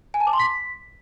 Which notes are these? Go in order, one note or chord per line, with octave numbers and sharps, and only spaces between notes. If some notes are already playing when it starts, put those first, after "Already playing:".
G#5
A5
D6
C6
B6